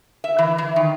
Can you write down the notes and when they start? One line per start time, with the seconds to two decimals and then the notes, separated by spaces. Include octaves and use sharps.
0.24 E5
0.39 E3
0.58 E3
0.76 D#3